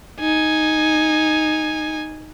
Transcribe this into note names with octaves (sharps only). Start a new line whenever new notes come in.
D#4 G#5